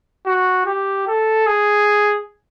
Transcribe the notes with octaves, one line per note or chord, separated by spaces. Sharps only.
F#4
G4
A4
G#4